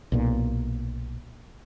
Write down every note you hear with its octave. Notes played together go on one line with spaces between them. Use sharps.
B1 A#2